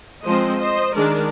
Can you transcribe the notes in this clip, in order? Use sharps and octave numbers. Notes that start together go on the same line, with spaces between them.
F3 G#3 C4 C5 D#5
C5 D#5
D#3 G#3 D4 A#4 D5